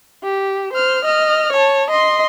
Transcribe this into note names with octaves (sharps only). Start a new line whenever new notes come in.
G4
C5 F6
D#5 F6
C#5 A5
D#5 C6